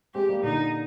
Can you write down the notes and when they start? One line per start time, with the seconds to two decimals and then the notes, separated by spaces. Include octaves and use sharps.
0.14 G#3 C4 G4
0.29 G3 A#3
0.43 A#2 D3 D#4